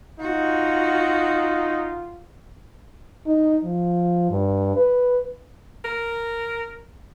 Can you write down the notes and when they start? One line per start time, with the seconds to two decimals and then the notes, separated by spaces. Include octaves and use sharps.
0.20 D#4 F4 F#4
3.27 D#4
3.64 F3
4.30 G2
4.76 B4
5.84 A#4